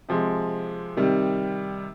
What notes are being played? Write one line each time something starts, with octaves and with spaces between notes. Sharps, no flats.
C3 F3 G#3
C3 D#3 G3